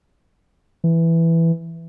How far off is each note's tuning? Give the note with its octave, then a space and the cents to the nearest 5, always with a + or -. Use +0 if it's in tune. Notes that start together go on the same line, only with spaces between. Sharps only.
E3 +5